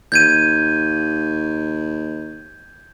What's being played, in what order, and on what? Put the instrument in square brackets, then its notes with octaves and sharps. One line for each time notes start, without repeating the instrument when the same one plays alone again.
[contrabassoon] D#2 [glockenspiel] G6 G#6 D#7